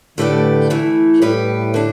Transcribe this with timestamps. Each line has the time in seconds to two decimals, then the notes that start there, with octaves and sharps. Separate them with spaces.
0.17 A2 D3 A3 G4 B4 D5
0.70 E3 A3 E4
1.22 A2 G3 B3 G4 B4
1.74 D3 A3 D4